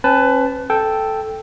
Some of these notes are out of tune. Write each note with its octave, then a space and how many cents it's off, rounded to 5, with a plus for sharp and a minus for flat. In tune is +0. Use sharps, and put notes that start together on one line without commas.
C#4 -35 B4 +20 A5 -10
A4 +0 G5 +0